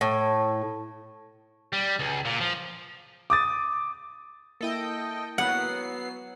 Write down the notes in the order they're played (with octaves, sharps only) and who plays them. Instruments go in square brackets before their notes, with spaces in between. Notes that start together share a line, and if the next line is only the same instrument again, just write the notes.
[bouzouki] A2
[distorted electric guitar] G3
C#2
A#2
F3
[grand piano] D6 D#6 A6
[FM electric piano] A#3 E4 [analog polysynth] A4 D#5 G5
[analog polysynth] F#3 B3 C7 [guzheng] F#5